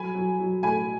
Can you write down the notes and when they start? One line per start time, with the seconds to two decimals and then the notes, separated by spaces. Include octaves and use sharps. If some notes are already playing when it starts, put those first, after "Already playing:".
Already playing: F#3 G#5 B5
0.15 F#3
0.39 F#3
0.63 A2 G#5 B5